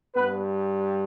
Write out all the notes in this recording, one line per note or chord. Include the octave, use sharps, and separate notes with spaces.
G2 G3 B3 B4